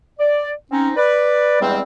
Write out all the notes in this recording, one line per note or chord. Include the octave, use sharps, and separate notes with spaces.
D5
C4 C#4 D#4
B4 D5
E2 G2 G3 G#3 C4